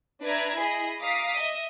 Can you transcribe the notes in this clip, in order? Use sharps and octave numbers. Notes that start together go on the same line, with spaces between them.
D4 B4 D5 E5 A#5 G#6
E4 G#4 D#5 B5
F5 A#5 D6 D#6 B6
D#5 E5